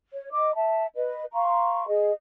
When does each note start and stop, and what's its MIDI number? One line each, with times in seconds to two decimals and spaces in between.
0.12 0.29 73
0.32 0.51 75
0.32 0.51 86
0.55 0.85 76
0.55 0.85 81
0.95 1.24 71
0.95 1.24 75
1.33 1.86 77
1.33 1.86 82
1.33 1.86 84
1.33 1.86 85
1.88 2.11 68
1.88 2.11 75